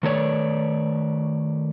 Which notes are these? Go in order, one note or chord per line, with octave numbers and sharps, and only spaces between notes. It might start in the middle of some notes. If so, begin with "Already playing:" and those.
D#3 A3 A4 B4 C#5 D5